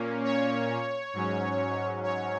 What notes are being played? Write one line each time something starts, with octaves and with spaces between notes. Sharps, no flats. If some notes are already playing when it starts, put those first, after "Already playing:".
Already playing: A#2 A#3 C#4
C#5
G#2 F#3 C#4
C#5